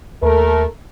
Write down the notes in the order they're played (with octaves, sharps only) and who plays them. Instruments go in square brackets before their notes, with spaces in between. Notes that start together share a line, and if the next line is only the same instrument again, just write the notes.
[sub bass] D#2 [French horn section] A3 A#4